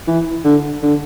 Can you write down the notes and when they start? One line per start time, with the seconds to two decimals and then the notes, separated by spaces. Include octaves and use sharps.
0.08 E3
0.45 D3
0.83 D3